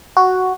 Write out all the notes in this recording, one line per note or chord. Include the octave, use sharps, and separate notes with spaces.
F#4